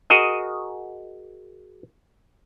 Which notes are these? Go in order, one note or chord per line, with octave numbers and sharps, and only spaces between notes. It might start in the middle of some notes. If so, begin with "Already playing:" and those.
F#4 G#4 A#4 D#5